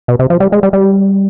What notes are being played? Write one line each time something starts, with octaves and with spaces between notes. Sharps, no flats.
B2
C3
F3
G3
G#3
G3
G3